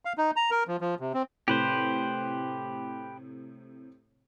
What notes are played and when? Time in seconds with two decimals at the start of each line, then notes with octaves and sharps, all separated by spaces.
0.05 F5
0.18 D#4
0.36 A#5
0.51 A#4
0.68 F3
0.81 F3
1.00 C3
1.14 C4
1.48 A2 C3 G4 B4 C5